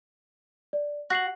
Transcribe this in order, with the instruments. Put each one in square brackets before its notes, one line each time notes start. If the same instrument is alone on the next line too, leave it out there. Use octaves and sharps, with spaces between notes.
[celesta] D5
[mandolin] F#4 [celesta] F#6 C7 F#7